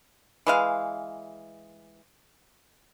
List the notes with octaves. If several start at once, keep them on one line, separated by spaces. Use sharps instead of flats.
E3 G#3 F5